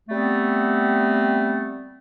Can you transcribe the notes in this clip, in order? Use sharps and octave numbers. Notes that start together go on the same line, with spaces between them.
G3 A3 B3 C4